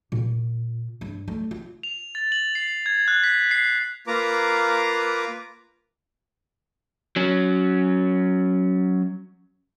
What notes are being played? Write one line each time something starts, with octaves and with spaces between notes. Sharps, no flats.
A#2
G2
A3
F4
F7
A6
F#7
C7
G#6
F#6
B6
C7
A#3 F4 B4 A#5 D6
F#3 C#4